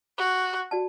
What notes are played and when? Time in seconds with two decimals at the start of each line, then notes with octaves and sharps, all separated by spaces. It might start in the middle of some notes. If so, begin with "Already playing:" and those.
0.18 F#4
0.71 F#4 D5 A5